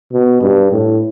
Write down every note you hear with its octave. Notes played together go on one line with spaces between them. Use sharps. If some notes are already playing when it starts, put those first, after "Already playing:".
B2
G2
A2